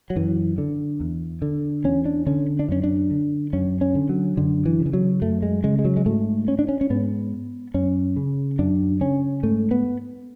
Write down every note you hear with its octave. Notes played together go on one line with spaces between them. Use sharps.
F#3
F#2 E3
D3
E2
D3
E2 C#4
D4
D3 C#4
D4
F#2 C#4
D4
D3
F#2 C#4
C#4
D3
F#3
F#2 D3
E3
C#3
E3
F#3
F#2 A3
G#3
C#3 G#3
G#3
F#3
G#3
G#2 A3
C#4
D4
C#4
C#4
G#2 B3
F#2 C#4
C#3
F#2 D4
C#3 C#4
G#2 A3
B3